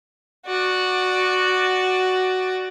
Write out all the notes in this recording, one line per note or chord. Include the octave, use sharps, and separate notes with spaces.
F#4 D5